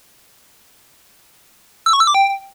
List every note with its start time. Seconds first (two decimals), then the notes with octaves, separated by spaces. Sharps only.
1.86 E6
1.93 C#6
2.00 E6
2.07 D6
2.14 G5